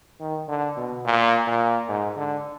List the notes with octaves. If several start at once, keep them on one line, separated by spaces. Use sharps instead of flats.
D#3
D3
B2
A#2
A#2
G#2
D3